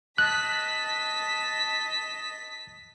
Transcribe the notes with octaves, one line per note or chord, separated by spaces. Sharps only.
D#5 A5 F#6 B6